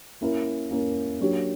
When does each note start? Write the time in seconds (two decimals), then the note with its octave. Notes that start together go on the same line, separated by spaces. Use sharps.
0.21 A#3 C#4 E4 A#4
0.71 A#3 C#4 E4 A#4
1.20 F#3 A#3 D4 G4 C#5